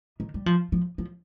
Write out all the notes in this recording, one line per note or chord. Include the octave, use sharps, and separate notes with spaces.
D#3
G3
F3
F3
F3